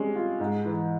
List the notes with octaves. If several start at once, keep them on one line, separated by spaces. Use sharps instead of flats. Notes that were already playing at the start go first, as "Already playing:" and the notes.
Already playing: G3 G#3 C4 C#4
F4
G#2
E3